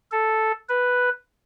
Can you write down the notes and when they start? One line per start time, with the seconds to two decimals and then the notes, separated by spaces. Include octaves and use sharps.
0.12 A4
0.69 B4